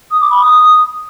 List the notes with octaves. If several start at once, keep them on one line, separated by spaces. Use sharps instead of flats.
D#6
D6
B5
D#6